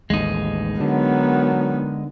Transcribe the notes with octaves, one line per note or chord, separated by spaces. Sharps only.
A1 D#2 G#3 D#4
D3 D#3 F#3 B3